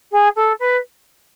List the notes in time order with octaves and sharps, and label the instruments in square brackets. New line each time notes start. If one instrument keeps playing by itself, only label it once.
[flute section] G#4
A4
B4